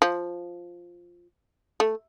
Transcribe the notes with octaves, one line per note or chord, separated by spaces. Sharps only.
F3
A3